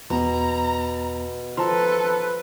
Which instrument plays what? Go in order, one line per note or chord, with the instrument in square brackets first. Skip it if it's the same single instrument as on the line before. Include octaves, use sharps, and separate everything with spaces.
[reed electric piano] E2 B3 [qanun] B2 [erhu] A#5
[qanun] F3 [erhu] A4 [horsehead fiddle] B4 [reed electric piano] A5 A#5 C6